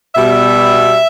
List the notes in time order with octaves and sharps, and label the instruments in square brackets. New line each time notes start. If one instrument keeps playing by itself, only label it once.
[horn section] B2 G3 E5